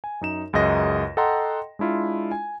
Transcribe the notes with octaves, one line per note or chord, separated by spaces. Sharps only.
G#5
F#2 D#4 E7
C#2 F#2 G#4 D#5 A#6
A4 D#5 F#5 G5 A#5 C6
G#3 D4 E4 F4
G#5